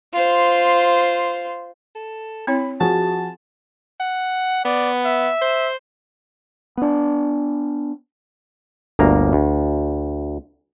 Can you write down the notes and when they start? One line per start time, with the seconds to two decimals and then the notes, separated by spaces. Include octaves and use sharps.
0.13 F4 C5
1.96 A4
2.47 C4 E4 C#5 B5
2.81 F3 F#4 G#4 A5
4.00 F#5
4.65 B3 D5
5.05 E5
5.41 C5
6.77 B3 D4
8.99 G1 D2 A#3 A#5
9.33 D2